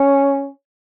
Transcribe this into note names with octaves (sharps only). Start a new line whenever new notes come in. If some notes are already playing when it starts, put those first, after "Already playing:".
Already playing: C#4